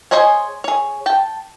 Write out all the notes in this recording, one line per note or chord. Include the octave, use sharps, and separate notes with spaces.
G#4 C5 C#5 D#5 G#5
G#4 C#5
G5 A5